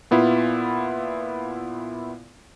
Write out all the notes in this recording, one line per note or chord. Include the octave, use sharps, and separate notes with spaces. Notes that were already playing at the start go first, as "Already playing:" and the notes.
A#2 B3 E4 F4